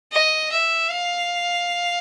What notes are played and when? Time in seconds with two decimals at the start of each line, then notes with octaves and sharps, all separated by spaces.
0.12 D#5
0.51 E5
0.90 F5